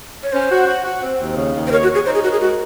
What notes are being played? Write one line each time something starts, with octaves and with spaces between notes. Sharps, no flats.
C#5
C#4 C5
F#4
F#4
F#4
C4
D#2
C#3
D#2
C5
A#4 C#5
F#4
C#5
G#4
D#4 C5
G#4
F#4 A#4
G#4
G#3 F#4